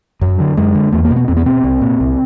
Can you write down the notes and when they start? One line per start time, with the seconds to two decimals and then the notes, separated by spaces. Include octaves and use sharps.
0.21 F#2 F#3
0.40 D3
0.57 F#2 G#3
0.75 D3
0.92 E2 A3
1.04 A#3
1.11 B2
1.16 B3
1.28 E2 C4
1.37 B3
1.46 B2 C4
1.64 C2
1.81 A#2
2.00 C2